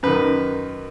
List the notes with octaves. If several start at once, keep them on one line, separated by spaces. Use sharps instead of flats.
F#2 D#3 B4